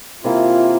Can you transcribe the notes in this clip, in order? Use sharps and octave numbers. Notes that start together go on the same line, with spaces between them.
C3 E3 A#3 E4 F4